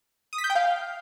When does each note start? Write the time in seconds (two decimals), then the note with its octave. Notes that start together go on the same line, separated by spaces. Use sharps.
0.33 D#6
0.38 B6
0.44 G6
0.50 G5
0.55 F5